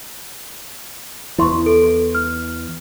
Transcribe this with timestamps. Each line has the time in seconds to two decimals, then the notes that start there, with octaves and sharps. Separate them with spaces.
1.38 E2 E3 E4 C6 C#6
1.66 A4 D7
2.15 F6